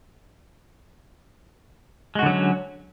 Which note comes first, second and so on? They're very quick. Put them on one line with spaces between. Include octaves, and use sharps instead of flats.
G#3 F#4 D3 F#3 C#4